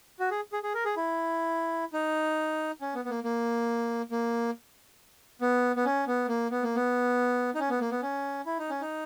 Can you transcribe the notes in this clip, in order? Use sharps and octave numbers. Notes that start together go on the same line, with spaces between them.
F#4
G#4
G#4
G#4
A#4
G#4
E4
D#4
C#4
B3
B3
A#3
A#3
A#3
B3
B3
C#4
B3
A#3
B3
A#3
B3
D#4
C#4
B3
A#3
B3
C#4
E4
D#4
C#4
D#4